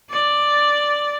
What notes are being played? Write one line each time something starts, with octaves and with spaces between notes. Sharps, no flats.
D5